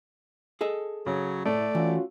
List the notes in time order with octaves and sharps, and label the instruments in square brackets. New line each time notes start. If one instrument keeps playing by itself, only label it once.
[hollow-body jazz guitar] G#4 A4 D#5
[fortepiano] C#3 [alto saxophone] F#3
[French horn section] A2 [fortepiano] A3 [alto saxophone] D5
[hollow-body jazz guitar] E3 [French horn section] C#4 F4 F#4